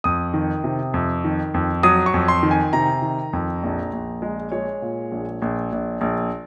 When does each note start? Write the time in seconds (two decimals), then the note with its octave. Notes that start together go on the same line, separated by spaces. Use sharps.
0.04 F2 D#6
0.34 D#3
0.64 C3
0.94 F2
1.24 D#3
1.54 F2
1.83 F#3 D#6
2.06 C#6
2.14 F2
2.28 C6
2.43 D#3
2.51 G#5
2.73 C3 A#5
3.02 D#3
3.33 F2
3.63 A#1
3.93 A#1
4.22 G#3
4.52 G#3 C#5
4.82 A#2
5.11 A#1
5.42 A#1
5.72 A#1
6.01 A#1